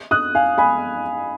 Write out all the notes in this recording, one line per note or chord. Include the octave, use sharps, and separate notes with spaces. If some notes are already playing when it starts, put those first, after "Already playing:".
D#6 F#6
F5 G#5
G#5 B5